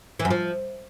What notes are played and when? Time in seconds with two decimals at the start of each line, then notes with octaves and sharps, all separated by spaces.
0.19 E3
0.25 F#2
0.30 F3